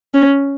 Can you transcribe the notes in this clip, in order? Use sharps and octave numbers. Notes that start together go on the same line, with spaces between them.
C#4